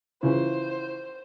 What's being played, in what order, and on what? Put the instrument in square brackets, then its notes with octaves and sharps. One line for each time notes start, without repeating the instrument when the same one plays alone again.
[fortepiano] C#3 E3 F3 [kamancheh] C5